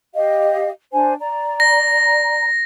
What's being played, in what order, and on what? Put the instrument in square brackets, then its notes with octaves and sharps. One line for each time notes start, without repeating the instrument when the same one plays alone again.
[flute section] G4 D#5 F5
D4 C5 G#5
D5 A#5
[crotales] A#6